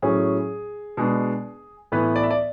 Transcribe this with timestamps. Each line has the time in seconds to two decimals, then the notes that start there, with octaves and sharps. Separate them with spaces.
0.02 A2 F#3 C#4 G#4
0.97 B2 G#3 D4
1.92 A2 E3 B3 B4
2.16 D5
2.23 E5
2.31 D5